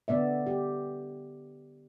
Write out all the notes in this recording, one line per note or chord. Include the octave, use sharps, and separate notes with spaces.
D3 B3 D5 E5
G4